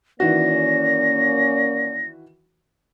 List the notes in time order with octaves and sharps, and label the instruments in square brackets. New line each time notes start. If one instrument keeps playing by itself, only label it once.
[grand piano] D#3 E3 F#4 [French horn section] A#3 C#4 D5 [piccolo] A#6